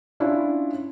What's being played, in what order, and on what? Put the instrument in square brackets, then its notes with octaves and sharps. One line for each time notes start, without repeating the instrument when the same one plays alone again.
[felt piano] C#4 D4 E4 F4